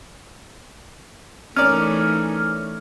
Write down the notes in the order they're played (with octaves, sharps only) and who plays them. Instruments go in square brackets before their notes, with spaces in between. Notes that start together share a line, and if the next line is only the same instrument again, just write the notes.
[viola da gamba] E3 A3 D#4 [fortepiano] C#4 A#4 D5 [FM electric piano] F6